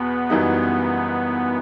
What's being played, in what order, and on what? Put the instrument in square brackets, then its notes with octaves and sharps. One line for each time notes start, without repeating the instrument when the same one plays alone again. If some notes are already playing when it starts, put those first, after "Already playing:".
Already playing: [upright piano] E2 B2 [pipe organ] B3
[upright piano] F#1 F#2 E3 G3 D#4